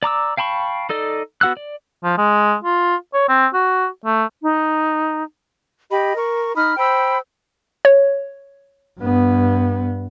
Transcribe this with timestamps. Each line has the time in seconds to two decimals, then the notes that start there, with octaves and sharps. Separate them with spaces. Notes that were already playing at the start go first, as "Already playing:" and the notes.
0.03 D5 A#5 D6 E6
0.37 F5 G5 A5 B5 C#6
0.89 D#4 A4 D5 D#5
1.41 B3 F#4 F#5 E6 F#6
1.57 D5
2.04 F3
2.18 G#3
2.64 F4
3.14 C#5
3.29 C4
3.54 F#4
4.05 A3
4.42 D#4
5.91 G4 D#5 B5
6.17 A#4 C#6
6.56 D#4 B5 D#6 F6
6.77 C5 G5 B5 E6
7.85 C#5
8.99 G2 B3